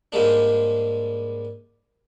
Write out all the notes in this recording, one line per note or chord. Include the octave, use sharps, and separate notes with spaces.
G#2 G3 G#3 A#3 D4